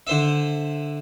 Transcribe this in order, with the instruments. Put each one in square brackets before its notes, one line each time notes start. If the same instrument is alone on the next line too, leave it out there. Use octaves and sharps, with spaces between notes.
[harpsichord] D3 C5 E5